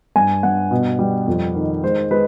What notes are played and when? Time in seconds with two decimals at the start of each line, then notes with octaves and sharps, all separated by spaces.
0.16 G2 G#5
0.43 G2 F#5
0.71 B2
0.99 G3
1.28 F2
1.55 D#3
1.84 G#3 C5
2.11 G#3 B4